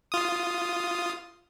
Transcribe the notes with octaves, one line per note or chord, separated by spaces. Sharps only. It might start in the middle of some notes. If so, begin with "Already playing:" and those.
F4 D#6